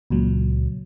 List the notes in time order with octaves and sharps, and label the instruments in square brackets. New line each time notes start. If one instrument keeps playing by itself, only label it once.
[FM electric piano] C#2 A#2 F#3